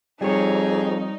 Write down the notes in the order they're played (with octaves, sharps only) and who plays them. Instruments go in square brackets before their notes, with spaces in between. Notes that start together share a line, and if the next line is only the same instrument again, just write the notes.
[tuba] F2 [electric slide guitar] G3 C#5 [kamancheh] D#4 [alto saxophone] G#4